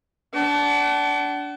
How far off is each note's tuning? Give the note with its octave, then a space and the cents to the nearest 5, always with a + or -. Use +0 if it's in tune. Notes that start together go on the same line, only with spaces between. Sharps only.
D4 -20 F#5 +35